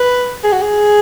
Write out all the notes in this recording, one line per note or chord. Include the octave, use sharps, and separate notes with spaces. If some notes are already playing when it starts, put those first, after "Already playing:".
Already playing: B4
G#4
F#4
G#4